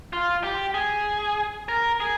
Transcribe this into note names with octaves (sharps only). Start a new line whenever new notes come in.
F4
G4
G#4
A#4
G#4